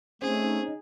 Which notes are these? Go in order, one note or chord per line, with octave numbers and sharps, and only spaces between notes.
A3 C4 C#4 D#4 G#4 C5